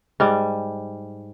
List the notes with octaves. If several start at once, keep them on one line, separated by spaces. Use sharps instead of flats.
G#2 G3